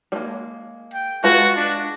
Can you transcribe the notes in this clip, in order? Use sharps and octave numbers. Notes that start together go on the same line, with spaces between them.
G3 G#3 A#3
G5
G#3 F4 F#4 B4
D4